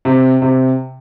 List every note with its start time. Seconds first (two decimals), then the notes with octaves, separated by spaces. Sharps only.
0.05 C3
0.42 C3